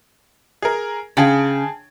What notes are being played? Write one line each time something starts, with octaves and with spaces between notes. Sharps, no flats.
G#4 A#4
C#3 G#4 G5 A5